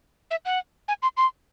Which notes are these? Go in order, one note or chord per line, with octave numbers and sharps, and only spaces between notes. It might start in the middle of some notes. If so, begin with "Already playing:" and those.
E5
F#5
G#5
C6
C6